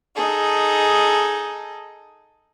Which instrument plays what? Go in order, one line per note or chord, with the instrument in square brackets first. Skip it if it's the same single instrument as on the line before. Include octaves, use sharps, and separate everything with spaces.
[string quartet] D#4 G#4 A4